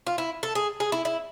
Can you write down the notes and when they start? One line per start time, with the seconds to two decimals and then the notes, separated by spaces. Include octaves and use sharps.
0.07 F4
0.18 E4
0.43 A4
0.55 G#4
0.80 G#4
0.92 E4
1.05 E4